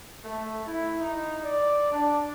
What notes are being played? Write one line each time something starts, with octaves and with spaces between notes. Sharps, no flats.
A3
E4
D#4
D5
D4